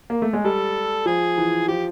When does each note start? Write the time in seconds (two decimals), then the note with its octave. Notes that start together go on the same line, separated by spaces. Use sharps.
0.10 A#3
0.22 A3
0.33 G#3
0.44 G3 A4
1.06 F3 G#4
1.38 E3
1.68 F3 G4